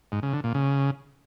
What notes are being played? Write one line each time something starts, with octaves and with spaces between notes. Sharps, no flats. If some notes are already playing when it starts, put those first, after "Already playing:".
G#2
C#3
D3
A#2
C#3